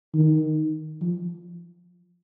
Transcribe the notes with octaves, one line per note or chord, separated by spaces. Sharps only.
D#3
F3